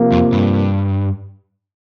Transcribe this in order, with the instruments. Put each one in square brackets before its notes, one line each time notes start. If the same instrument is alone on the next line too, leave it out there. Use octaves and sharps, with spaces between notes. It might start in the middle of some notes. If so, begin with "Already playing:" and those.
Already playing: [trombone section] C3 F3 A#3
[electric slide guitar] F2
G2